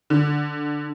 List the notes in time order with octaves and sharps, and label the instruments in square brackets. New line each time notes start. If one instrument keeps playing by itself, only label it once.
[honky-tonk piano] D3